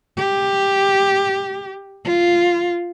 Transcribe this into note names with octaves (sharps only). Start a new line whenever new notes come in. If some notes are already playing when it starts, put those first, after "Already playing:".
G4
F4